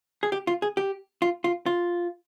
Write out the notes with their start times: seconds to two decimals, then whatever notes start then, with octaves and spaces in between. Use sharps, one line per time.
0.23 G#4
0.32 G4
0.47 F4
0.62 G#4
0.77 G4
1.22 F4
1.44 F4
1.66 F4